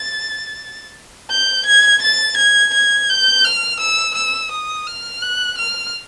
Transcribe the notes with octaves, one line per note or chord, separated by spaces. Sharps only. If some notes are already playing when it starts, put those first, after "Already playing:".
Already playing: A6
G6
G#6
A6
G#6
G#6
G6
F6
E6
E6
D#6
F6
F#6
F6